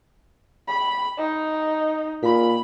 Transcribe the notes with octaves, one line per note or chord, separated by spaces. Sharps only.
B5
D#4
A#2 B5